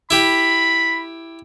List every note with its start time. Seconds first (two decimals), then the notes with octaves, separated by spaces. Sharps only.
0.11 E4 G4 B5